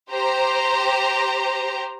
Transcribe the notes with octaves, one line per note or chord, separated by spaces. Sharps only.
G4 C5 A#5